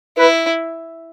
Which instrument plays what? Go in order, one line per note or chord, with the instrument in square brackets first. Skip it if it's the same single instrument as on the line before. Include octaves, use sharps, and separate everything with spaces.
[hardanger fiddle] E4 [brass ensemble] B4